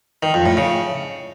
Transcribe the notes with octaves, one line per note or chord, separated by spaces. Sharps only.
D#3
F2
A2
C#3